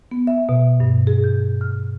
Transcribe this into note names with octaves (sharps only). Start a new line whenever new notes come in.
B3
E5
B2
G2
G#4
G6
F6